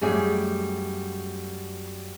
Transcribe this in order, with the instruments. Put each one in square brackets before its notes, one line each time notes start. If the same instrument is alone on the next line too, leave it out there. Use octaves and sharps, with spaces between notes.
[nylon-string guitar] F#2 G3 A3 G#4